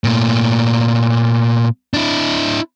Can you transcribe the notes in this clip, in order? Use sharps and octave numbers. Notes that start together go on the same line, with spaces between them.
A#2 A3
D4 E4